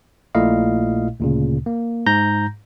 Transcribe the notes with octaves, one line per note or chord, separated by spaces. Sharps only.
A#1 A#2 A3 E4 D#5 F5
D2 A#2 C#3
A#3
G#2 A#5 G6 A#6